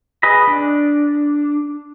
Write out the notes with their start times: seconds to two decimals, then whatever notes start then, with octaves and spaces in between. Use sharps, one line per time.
0.23 G#4 B4 D#5 B5
0.48 D4